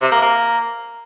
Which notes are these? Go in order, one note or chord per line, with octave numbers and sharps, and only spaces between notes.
C3
A#3
A#3